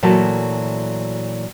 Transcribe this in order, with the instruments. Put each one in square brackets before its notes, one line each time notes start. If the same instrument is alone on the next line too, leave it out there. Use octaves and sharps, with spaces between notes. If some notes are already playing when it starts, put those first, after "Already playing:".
[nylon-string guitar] A#2 E3 F#3 A3 F#4 A4